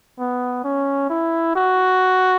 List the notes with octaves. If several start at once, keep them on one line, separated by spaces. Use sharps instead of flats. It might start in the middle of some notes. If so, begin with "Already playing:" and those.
B3
C#4
E4
F#4